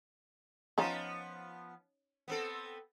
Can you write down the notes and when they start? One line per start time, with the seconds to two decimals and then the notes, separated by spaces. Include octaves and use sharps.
0.78 F3 B3 C#4 D#4 F4
2.28 B3 C4 A4